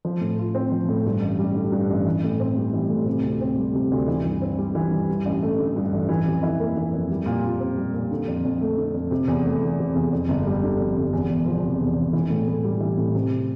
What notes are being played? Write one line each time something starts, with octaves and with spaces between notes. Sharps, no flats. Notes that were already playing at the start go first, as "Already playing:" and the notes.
F3
A2
F4
C4
F3
A2
G2
A1
G3
D3
G2
A1
E3
A2
C4
G3
E3
A2
C3
D2
C4
G3
C3
D2
E3
G2
C4
G3
E3
G2
G2
A1
A3
D3
G2
A1
E3
F2
E4
A#3
E3
F2
G3
A#2
F4
C4
G3
A#2
D3
F2
F2
A3
D3
F2
C3
E2
A3
E3
C3
E2
F2
G1
G3
D3
F2
G1
E2
E1
F3
C3
E2
E1
E3
A2
A2
G3
E3
A2
C3